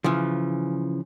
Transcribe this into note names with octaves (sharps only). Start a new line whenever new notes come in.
C#3 E3 F3